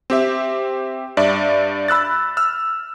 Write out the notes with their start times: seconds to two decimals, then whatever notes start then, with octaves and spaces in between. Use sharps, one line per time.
0.10 C4 G4 E5
1.17 G2 D5 E5
1.88 B5 E6 F#6 A6
2.37 E6 F6